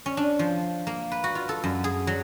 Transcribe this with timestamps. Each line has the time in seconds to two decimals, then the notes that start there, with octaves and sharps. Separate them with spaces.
0.06 C#4
0.17 D4
0.39 F3
0.87 A#3
1.12 B4
1.24 F#4
1.35 F4
1.49 A4
1.64 F#2
1.84 G#4
2.07 F#3